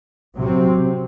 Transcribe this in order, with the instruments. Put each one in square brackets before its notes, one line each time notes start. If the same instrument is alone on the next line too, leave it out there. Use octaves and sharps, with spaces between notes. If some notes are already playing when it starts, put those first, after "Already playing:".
[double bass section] C3 F#3 C4